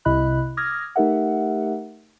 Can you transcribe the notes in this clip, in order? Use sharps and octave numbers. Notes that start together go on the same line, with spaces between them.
C2 C3 E4 D#5 B5 F#6
D6 D#6 F6 G#6 A#6
A3 D#4 G4 A#4 E5 F#5